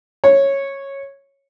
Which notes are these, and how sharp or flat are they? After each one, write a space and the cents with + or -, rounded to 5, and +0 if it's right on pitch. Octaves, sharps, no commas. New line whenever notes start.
C#5 -10